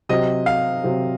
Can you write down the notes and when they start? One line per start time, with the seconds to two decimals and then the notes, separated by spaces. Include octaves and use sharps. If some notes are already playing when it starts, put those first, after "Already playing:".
0.09 C3 F#3 C4 D#5
0.46 F5
0.84 C3 F#3 C4